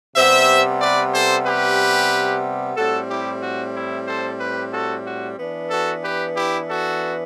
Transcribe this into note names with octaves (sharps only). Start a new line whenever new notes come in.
C3 G3 B3 C5 E5
B4 D5
A4 C5
G4 B4
A2 G3 C4 F#4 A4
E4 G4
F#4
E4
A4 C5
G4 B4
F#4 A4
F#4
E3 B3 D4
F#4 A4
G4 B4
E4 G4
F#4 A4